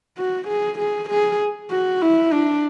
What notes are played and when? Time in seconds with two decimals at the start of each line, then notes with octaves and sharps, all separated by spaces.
0.18 F#4
0.48 G#4
0.79 G#4
1.09 G#4
1.71 F#4
2.02 E4
2.32 D4